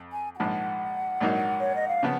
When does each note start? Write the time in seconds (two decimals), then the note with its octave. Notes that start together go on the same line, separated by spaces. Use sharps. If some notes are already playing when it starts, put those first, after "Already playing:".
Already playing: F2
0.12 G#5
0.34 G#5
0.39 A#1 G#2 F3 F#5
1.21 A#1 G#2 F#3 A#3 D#4
1.61 C#5
1.75 D#5
1.89 F5
2.03 C#3 F3 B3 F#5